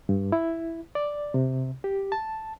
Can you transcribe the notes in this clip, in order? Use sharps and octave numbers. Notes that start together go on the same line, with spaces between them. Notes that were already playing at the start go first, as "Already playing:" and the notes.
G2
E4
D5
C3
G4
A5